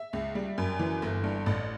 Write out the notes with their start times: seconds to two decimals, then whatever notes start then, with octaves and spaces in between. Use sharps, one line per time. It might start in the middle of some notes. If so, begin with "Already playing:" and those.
Already playing: E5
0.13 C#2
0.35 G3
0.58 F#2
0.79 E3
1.02 G1
1.24 G2
1.46 A1